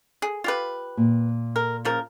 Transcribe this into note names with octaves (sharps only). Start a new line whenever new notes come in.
G#4
F4 G4 B4
A#2
A#4
C#3 F3 A#4